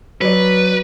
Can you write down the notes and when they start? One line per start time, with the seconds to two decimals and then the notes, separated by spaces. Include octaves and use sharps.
0.21 F#3 B4 D5